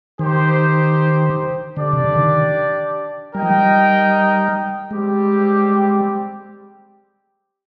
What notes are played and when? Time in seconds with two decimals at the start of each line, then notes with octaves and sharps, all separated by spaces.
0.19 D#3 D#4 G4 C5
1.77 D3 D4 G4 D5
1.93 C3
2.04 D3
2.16 D#3
3.34 G3 D#4 A#4 D#5 G5
3.42 F3
3.49 G3
4.91 G3 G#3 C4 G4